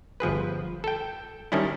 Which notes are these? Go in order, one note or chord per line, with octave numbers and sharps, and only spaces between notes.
G1 F3 G#4 B4
A4 G5
D#3 G3 C#4 D4 E4